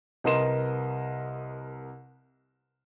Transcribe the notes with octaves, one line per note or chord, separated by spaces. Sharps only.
C2 A#4 B4 D#5 C6 E7